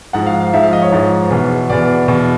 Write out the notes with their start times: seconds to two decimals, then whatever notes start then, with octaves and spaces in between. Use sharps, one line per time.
0.13 G#2 F3 F#5
0.26 F5
0.40 F5
0.53 G#2 F3 E5
0.63 F5
0.73 D#5
0.82 C#5
0.92 G#2 F3
1.30 E2 B2
1.69 E2 B2 D5
2.08 E2 B2